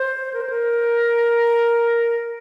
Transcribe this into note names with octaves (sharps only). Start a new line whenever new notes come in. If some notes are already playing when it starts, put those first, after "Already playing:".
Already playing: C5
A#4
C5
A#4